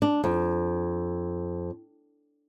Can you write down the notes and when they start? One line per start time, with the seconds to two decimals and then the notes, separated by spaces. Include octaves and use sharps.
0.02 D4
0.24 F2